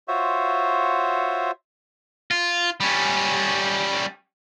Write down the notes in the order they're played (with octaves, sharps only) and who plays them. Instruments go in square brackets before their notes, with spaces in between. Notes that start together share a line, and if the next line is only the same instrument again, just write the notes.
[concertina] F4 F#4 C5 C#5 E5
[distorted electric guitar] F4
G3 C#4